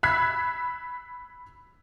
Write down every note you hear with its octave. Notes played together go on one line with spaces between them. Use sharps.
B5 E6 F#6 G#6 B6 C7